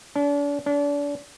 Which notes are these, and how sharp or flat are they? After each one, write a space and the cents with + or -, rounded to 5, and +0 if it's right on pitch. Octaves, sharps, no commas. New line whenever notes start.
D4 -40
D4 -35